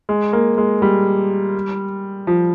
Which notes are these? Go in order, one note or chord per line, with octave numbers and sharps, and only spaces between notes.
G#3
A#3
G#3
G3
F3